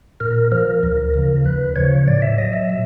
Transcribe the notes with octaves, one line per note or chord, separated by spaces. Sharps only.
A#2 A#4
F3 A#4
D2
C#3 F3
D#2 B4
C#3 F3 C#5
A2 D5
E5
F#3 D#5
E5
A#2